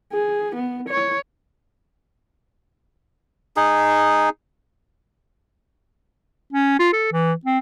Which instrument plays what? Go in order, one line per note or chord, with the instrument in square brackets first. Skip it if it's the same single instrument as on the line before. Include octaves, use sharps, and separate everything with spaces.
[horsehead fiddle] G#4
B3
C#5
[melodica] D#4 G#4
[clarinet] C#4
F4
A4
E3
C4